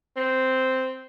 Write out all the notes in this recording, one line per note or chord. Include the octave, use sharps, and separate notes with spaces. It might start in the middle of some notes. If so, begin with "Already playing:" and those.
C4